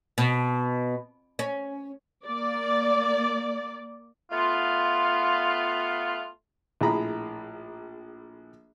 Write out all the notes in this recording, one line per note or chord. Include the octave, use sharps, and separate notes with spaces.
B2
C#4
A#3 D5
A3 B3 F4
A#1 A2 G#4 A#5 B5